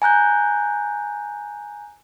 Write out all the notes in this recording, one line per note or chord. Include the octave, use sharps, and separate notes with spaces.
G#5 A#5 F#6 G6